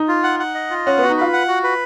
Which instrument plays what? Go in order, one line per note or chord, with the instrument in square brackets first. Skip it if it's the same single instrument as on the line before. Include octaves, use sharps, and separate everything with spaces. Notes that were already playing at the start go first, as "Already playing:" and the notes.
Already playing: [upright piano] D#4
[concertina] F4
F#5
F#5
D#5
F4
[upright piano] C#4 [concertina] F#5
[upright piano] B3 [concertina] F#4
[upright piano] D#4
[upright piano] F4 [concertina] B4
[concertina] F#5
F#4
B4